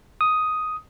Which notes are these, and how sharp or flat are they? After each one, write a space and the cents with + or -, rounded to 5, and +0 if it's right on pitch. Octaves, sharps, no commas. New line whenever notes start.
D#6 +5